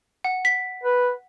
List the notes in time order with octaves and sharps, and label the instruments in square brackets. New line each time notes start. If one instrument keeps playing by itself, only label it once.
[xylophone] F#5
B6
[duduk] B4